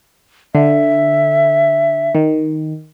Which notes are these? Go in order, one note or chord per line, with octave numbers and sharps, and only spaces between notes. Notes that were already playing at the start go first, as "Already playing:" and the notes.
D3 E5
D#3